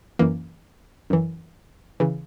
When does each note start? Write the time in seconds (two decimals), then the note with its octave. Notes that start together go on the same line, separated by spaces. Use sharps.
0.19 F#2 E3 A#3
1.10 F#2 E3
2.00 C#3 E3